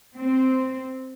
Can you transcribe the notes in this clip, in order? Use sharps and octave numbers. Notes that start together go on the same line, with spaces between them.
C4